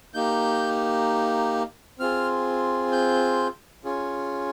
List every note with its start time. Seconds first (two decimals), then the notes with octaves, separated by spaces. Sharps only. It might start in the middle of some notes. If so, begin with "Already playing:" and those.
0.14 A#3 D#4 G4 G6
1.99 C4 F4 G#4 F6
2.92 G6
3.85 C#4 F4 G#4